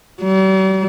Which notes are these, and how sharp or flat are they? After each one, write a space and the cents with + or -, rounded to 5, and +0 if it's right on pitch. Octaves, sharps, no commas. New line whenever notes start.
G3 -45